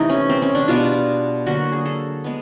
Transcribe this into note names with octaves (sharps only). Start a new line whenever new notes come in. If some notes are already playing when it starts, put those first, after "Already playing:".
Already playing: C3 E3 A3 D#4
C#4
C4
C#4
D4
B2 G3 B3 F4
D3 F#3 A#3 F#4
G#4
A4
G#3 B3